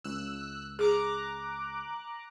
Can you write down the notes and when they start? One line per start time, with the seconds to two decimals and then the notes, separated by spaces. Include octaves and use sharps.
0.04 C#2 E6 F#6
0.79 G#4 A#5 D6 F#6